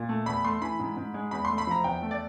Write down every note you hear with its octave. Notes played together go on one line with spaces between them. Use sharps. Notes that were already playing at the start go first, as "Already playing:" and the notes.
Already playing: A#2
A3
E2 B5
A3 C6
E3 B5
G#2
G#2
G#3
E2 B5
A3 C6
B5
F3 A#5
E2 G5
A3
D5